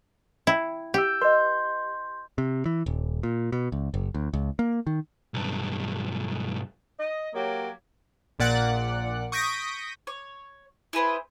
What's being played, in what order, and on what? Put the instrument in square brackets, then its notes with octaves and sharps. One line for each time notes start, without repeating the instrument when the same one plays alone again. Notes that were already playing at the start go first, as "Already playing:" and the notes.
[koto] E4 [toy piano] G5
[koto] G4 [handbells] E6 G6
[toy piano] B4 D#5 [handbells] C6 G6
[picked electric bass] C3
E3
D#1
A#2
B2
C#2
F#1
D2
C#2
A#3
D#3
[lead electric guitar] B1 G2
[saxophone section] D#5
F#3 A#3 G4 C#5
[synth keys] A#1 A#2 D5 F#5 F#6
C#6 D#6 G6 A#6 B6 D7
[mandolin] C#5
E4 G#4 B4 C5